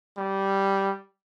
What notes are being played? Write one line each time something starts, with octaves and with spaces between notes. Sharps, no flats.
G3